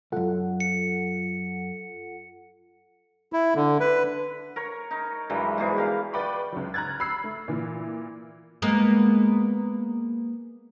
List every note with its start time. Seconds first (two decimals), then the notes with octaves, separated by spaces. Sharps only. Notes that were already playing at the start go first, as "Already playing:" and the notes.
0.12 C2 F#2 F4 A4 F#5
0.60 C#7
3.33 E4
3.55 D3
3.80 B4
4.56 A#4 C#5
4.91 D#4
5.30 G2 E3 F#3 G#3
5.58 G#2 B2 E3 G#4
5.77 G4 A#4 F5
6.13 B4 D5 G5 B5 C#6
6.52 C#2 F#3
6.74 A#5 F6 F#6 G#6 A6
7.00 B5 E6 C7
7.24 A3
7.48 A#2 E3
8.62 G#3 A#3 B3